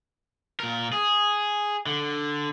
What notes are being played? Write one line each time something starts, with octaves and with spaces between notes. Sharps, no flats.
A#2 A#4
G#4
D3